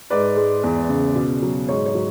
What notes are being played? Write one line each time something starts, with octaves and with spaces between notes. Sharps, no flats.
G#2 B4 D5
G#3
E2
C#3
B2
F#3
G#2 C#5
C#5
F#3